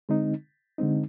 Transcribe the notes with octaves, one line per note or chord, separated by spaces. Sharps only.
D3 G#3 C4 D#4
D3 G#3 C4 D#4